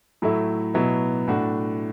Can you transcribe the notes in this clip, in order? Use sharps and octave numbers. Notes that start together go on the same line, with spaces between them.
A2 F#3 A3 E4
B2 F#3 B3 E4
A2 A3 D4 F#4